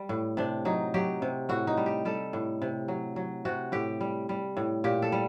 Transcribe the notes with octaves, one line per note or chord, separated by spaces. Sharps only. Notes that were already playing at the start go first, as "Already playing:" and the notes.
Already playing: G3
A2
C3 D4
F#3 D#4
F#3 G4
C3
A2 F#4
D#4
G3
G4
G3 A4
A2
C3
F#3
F#3
C3 F#4
A2 G4
G3
G3
A2
A#2 G4
A4
G3